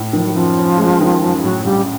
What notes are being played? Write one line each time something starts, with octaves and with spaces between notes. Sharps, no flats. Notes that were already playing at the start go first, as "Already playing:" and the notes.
Already playing: A2
D#3 F3
F#3
F#2 F3
C#4
G#3
D#3
F#2
F3
A2 F#3
A#1 G3